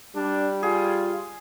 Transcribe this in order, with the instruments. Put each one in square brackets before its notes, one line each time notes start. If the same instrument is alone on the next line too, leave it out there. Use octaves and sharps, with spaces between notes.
[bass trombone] G3 [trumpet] D4
[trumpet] F4 [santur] G#4